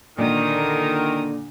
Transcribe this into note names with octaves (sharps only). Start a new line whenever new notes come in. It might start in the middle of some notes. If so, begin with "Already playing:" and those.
A#2 D3 D#3 D4 A4 D5 A#5 D#6